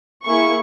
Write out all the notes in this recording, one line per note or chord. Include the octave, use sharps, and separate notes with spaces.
A#3 E4 G#4 C#6